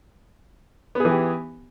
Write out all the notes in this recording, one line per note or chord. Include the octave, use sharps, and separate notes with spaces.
E3 B3 G4 G#4